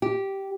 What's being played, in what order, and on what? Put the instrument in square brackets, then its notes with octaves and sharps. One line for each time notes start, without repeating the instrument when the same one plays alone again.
[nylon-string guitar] G4